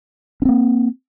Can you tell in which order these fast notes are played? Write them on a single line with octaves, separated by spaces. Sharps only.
C#4 C4 A#3